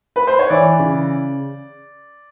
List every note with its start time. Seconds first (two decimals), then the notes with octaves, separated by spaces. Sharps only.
0.16 B4
0.27 C5
0.39 C#5
0.50 E3 D5
0.79 C#3